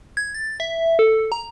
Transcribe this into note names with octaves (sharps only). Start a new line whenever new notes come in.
G#6
A6
E5
A4
A#5